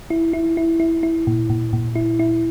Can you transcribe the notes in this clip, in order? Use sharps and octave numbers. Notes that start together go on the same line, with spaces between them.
E4
E4
E4
E4
E4
A#2
A#2
A#2
E4
E4